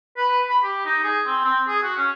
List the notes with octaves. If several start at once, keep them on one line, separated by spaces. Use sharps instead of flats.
B4
B5
G4
D#4
G#4
C4
C4
G#4
F#4
C#4